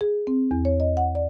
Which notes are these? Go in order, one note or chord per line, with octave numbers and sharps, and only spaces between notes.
G#4
C4
E2
C#5
D#5
F#5
D5